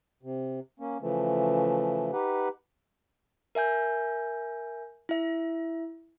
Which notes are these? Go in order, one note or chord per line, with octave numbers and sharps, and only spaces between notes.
C3
A#3 C#4
C#3 E3 F3 A3
D#4 G4 B4 F#5
A#4 E5 G#5 G6
E4 E5